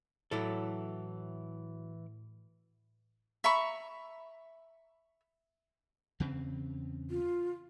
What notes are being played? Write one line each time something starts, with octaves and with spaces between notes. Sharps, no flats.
A2 E3 F#3 E4 A4 C#5 D6
E5 A#5 B5 C#6
E2 C#3 C4
F4